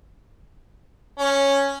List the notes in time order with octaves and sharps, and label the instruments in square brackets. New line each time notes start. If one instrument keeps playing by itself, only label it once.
[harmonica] C#4